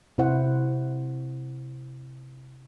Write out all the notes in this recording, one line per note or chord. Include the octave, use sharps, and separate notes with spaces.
C3 E4 C5 F#5